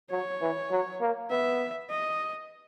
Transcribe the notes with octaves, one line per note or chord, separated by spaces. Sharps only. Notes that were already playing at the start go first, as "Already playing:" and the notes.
F#3 C#5
E3
F#3
A#3
B3 E5
D#5